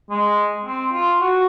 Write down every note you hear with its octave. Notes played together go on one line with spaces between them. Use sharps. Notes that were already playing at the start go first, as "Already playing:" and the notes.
G#3
C4
F4
F#4